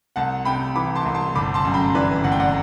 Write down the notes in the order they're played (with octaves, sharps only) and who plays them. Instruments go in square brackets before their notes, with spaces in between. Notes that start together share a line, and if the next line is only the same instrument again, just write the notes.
[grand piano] C2 F#5 A5
C3 G5 B5
E3 B5 D6
A5 C6
C2
A5 C6
G1 B5 D6
A5 C6
F#2
G5 B5
E3 B4 D5
G1 F#5
G5
D5 F#5